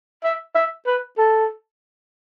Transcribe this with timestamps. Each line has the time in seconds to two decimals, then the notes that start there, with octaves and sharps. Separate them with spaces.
0.24 E5
0.55 E5
0.87 B4
1.18 A4